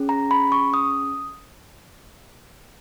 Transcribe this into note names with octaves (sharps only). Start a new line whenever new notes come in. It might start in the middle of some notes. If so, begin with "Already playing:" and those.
Already playing: C#4 G#4
A#5
B5
C#6
D#6